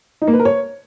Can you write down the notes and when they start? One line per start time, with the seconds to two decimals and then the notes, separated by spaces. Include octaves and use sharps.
0.22 D#4
0.27 A#3
0.33 B4
0.39 A#4
0.45 C#5